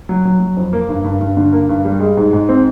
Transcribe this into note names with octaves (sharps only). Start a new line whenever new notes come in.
F#3
F#3
F#3
F2
A#3
G2
G2
G2
D3
A#3
G2
G3
G#3
G#2
G#2
C4